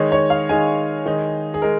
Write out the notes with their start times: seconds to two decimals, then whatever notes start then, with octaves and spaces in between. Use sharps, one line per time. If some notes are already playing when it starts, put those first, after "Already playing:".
Already playing: D#3 G#3 D#4 C#5
0.12 C#5
0.30 F5
0.49 D#3 G#3 D#4 G#5
1.06 D#3 G#3 D#4
1.54 G#4
1.62 G#3 D#4 A#4